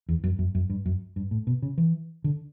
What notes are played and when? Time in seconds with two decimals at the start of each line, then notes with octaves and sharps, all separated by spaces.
0.09 E2
0.24 F#2
0.39 F#2
0.55 F#2
0.70 G2
0.86 F#2
1.16 G2
1.31 A2
1.47 B2
1.62 C#3
1.78 E3
2.24 D3